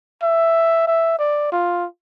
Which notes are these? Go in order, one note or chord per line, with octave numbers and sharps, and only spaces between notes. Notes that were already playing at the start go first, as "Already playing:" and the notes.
E5
E5
D5
F4